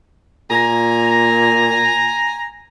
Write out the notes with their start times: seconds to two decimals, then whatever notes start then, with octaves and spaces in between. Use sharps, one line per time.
0.51 A#2 G#5 A#5